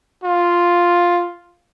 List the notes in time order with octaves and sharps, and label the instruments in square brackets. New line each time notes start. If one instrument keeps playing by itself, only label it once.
[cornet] F4